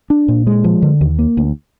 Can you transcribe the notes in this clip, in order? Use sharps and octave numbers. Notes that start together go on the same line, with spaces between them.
D4
A#2
G#3
F3
D3
D#2
A#3
D2